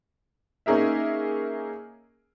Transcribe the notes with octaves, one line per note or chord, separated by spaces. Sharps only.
A#3 C#4 D#4 G#4 A#4 E5